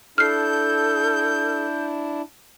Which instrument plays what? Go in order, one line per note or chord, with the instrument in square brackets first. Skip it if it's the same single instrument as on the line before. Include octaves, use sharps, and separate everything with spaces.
[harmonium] D4 E4 [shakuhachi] A4 [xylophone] F6 C7 [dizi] G6